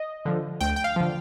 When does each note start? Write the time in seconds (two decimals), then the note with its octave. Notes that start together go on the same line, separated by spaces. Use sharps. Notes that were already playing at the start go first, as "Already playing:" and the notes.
Already playing: D#5
0.25 D3 F3
0.61 D2 G5
0.76 G5
0.84 F5
0.96 D3 F3